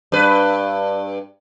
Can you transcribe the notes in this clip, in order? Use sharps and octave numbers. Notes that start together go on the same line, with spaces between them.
G2 B4